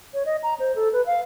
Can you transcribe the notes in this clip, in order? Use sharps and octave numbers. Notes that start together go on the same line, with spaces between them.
C#5
D#5
A#5
C5
A4
B4
F5